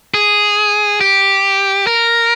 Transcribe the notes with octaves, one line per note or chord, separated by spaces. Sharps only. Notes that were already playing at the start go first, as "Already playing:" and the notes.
G#4
G4
A#4